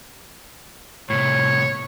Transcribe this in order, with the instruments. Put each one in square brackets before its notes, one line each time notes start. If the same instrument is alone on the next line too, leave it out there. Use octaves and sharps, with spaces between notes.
[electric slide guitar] A2 C3 [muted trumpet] C#5